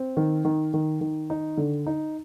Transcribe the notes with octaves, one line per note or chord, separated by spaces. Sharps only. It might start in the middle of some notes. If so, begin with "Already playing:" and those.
Already playing: C4
D#3
D#3
D#3
D#3
D#4
D3
D#4